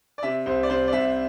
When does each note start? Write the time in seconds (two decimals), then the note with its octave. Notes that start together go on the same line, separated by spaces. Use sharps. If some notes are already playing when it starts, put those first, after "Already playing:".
0.18 D5
0.23 C3 E5
0.46 C2 C5
0.63 D5
0.70 C3 C5
0.88 D5
0.93 C2 E5